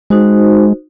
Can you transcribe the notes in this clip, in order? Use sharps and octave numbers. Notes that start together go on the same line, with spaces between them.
G#3 D#4 F#4 C5